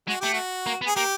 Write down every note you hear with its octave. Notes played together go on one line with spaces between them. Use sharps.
G#3 F#4
A3 G4
F#4
A#3
B3
G#4
A#3 G4